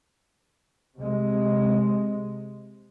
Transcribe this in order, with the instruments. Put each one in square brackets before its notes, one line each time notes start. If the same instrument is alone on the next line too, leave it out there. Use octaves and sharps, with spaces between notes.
[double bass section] C3 G#3